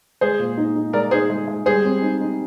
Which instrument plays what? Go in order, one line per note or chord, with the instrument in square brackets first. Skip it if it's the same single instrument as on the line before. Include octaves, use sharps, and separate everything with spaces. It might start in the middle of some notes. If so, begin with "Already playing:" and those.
[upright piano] G#3 [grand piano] G#4 C5
[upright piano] A#2
D#4
D#4
[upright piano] G#3 [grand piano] A#4 D5
[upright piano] D#4 [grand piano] G#4 C5
[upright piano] G#3
G#3
[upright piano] G3 [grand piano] G#4 C5
[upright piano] C4
D#4
D#4